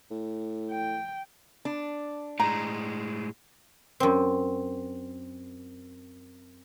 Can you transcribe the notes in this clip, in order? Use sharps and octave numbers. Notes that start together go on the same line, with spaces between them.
A2
G5
D4
A2 G#3 A#5
F#2 C4